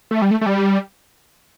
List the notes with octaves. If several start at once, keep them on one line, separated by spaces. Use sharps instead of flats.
A3
G3
A3
A3
G3